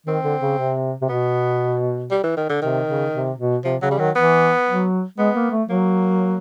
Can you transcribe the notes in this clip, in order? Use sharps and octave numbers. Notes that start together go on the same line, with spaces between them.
D#3 C4
D3
C#3
C3
C3
B2 B3
G3
E3
D#3
D3
C3 D#3
C#3
C3
B2
C3 F3
C#3 F#3
G3
D#3 F#3
E3 B3
F#3
G#3 B3
A#3
A3
F#3 A#3